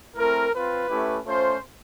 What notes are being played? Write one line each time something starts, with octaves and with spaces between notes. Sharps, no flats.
A3 C4 E4 A#4
C4 F4 B4
A3 C#4 E4 G4
A3 C#4 F4 C5